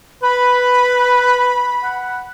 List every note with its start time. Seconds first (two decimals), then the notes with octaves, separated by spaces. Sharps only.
0.23 B4 B5
1.83 F#5